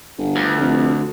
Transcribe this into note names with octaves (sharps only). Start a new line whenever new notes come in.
G1
D2
F1